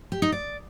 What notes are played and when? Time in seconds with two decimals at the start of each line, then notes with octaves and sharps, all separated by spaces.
0.12 G4
0.22 D#4
0.32 D5